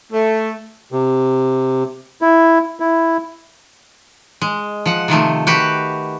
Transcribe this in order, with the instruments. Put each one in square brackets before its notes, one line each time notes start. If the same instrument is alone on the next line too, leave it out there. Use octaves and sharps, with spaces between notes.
[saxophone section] A3
[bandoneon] C3
E4
E4
[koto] G#3
F3 F#5
C3 D#3 F3 A3
F#4 G4 B4